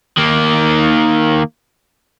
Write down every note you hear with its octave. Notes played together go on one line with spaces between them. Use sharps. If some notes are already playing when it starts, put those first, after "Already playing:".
D#3 A#3